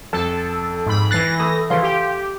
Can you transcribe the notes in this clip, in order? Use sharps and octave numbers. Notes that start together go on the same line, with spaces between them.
F2 A4 A5
G#2 B5
E3 F#6 A6 A#6 C7
A3 A4 B5 D#6
C#3 E3 F3 F5 C6
G4